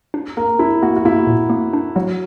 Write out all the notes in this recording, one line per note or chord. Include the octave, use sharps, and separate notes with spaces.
D4
A#3 A#4
D4 E4
A#3 F#4
F#4
A#3 E4
A#2
A#3
D4
F#3 F#4